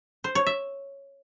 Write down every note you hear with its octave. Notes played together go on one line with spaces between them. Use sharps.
C5
C#5
E5